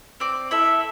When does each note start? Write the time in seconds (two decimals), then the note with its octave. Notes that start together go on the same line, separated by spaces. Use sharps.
0.20 C4 D5
0.51 E4 A4 E5